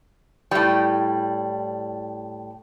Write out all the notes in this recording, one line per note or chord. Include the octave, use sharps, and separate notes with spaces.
A2 G3